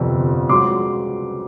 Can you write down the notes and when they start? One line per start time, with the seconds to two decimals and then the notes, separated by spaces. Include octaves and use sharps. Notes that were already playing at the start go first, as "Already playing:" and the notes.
Already playing: G1 F2 C3
0.49 C#2 C#3 F#3 C6 D6